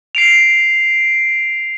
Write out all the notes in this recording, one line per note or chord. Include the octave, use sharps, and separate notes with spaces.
C7 D7 F7